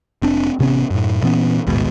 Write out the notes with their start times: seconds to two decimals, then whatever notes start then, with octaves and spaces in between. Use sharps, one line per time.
0.22 F1 C4 D4
0.59 A1 C3 B3 C#4
0.90 F#2 A2
1.22 A#2 E3 B3 C#4
1.67 A1 D#2 G#2 B2